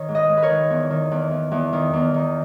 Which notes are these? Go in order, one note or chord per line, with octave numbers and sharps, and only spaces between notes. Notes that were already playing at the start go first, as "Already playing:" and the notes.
Already playing: D#3 C#5
G#2
B4 D#5
G#2
B4
A#4 C#5
D#3
E2
D#3
E2
E2
E2
D#3
E2
D#3